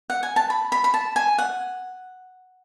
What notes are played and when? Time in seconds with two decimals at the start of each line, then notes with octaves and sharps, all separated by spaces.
0.10 F#5
0.23 G#5
0.36 A5
0.50 B5
0.72 B5
0.84 B5
0.94 A5
1.16 G#5
1.38 F#5